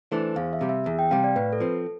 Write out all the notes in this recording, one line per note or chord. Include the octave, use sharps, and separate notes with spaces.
E3 A3 D4 C5
E2 F5
E5
C3 G3
E5
E2
G5
C3 G3 F5
D5
A2 B4
A4
F3 C4